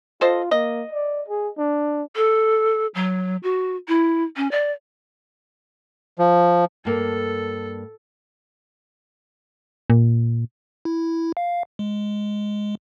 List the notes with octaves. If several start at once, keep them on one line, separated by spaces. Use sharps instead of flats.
F4 A4 C5 D#5
A#3 D#5
D5
G#4
D4
A4
F#3
F#4
E4
C#4
D5
F3
G2 A#3 A4
A#2
E4
F5
G#3